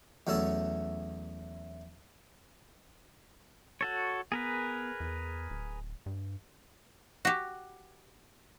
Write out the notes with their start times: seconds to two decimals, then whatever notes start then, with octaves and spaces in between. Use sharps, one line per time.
0.27 E2 F#3 A3 C#4 E4 A5
3.81 F#4 A4 C#5
4.32 B3 G#4 A#4 B4
5.00 E2
5.50 D1
6.06 G2
7.25 F#4 G4